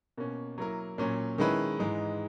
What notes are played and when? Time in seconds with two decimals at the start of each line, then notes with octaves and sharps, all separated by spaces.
0.18 B2 A#3 C#4
0.58 F#3 A#3 E4 A#4
0.98 A#2 F#3 C#4
1.38 D#3 G#3 C#4 E4 B4
1.79 G#2 E3 G#3 D#4